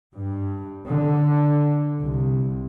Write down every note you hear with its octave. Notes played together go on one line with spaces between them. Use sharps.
G2
D3
C2